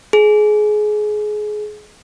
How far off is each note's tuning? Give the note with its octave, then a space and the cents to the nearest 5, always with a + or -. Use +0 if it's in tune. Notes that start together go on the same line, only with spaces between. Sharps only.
G#4 +25